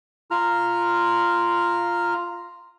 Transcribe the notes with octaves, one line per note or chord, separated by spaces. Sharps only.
F4 A#5 F6